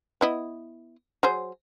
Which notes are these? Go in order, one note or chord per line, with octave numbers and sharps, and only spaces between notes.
B3 E4 D#5
F#3 G#4 C5